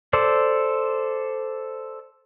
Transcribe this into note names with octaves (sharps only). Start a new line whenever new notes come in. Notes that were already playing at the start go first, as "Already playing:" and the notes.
A4 C5 D5